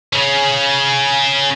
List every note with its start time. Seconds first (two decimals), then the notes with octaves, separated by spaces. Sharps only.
0.13 C#3 C#4